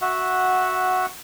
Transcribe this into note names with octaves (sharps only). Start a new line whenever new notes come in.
F#4 E5 F#5